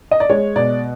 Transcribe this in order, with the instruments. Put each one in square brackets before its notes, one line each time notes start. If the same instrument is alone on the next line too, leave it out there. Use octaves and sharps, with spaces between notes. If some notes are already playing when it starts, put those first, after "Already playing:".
[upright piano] D#5
D5
G#3 C#5
B2 D5